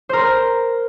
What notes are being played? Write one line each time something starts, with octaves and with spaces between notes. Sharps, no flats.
A#4 C5